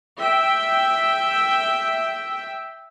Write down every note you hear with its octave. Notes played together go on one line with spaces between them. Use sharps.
E5 G5